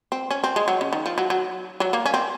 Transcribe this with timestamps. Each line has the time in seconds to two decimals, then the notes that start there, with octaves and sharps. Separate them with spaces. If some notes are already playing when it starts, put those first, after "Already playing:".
0.12 C4
0.31 C#4
0.44 C4
0.56 G#3
0.68 F#3
0.81 C#3
0.93 D#3
1.06 F3
1.18 F#3
1.30 F#3
1.80 F#3
1.93 A#3
2.06 C#4
2.14 C4